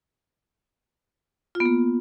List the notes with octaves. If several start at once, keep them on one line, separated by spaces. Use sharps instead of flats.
F4
B3
A#3